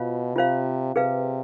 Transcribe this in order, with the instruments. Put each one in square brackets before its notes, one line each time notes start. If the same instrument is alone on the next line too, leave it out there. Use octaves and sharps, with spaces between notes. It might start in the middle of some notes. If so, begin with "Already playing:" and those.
Already playing: [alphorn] B2 [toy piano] F4 C5 F5
[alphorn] C3 [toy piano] F4 C5 F5
[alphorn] C3 [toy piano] G#4 B4 F5